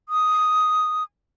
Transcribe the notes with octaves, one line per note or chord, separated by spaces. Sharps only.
D#6